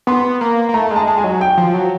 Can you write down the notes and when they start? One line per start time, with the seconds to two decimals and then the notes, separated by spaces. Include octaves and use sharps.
0.07 B3 C6
0.41 A#3
0.69 A#3
0.74 A3 A#5
0.91 G#3 A5
1.07 G#3
1.18 G#5
1.24 F#3
1.41 G5
1.57 F3
1.74 F#3